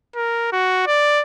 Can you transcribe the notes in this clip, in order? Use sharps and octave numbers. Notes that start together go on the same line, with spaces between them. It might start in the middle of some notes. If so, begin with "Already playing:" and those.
A#4
F#4
D5